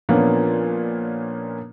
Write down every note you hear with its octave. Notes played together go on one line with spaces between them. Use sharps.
A#2 F3 A#3 B3 C#4 D4